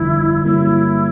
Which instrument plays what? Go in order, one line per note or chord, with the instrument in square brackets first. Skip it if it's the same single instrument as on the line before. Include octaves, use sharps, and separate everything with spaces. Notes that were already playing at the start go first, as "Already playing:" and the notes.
Already playing: [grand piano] G1 F2 D3 F3 [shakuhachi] E4
[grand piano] G2 D3 F#3 A#3 C#4 [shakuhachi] E4